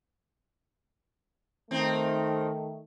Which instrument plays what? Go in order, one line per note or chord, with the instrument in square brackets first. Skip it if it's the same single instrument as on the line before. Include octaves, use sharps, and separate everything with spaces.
[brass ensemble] D#3 A3 [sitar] C4 D#4